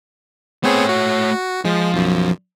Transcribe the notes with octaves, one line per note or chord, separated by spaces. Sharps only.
A3 B3 C4 G#4 C#5
F#4
F3 G#3
B1 F#2